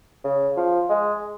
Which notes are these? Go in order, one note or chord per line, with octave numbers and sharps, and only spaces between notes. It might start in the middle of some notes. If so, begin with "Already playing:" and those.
C#3
F3
G#3